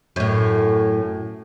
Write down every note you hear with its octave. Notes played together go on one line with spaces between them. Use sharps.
F#2 A2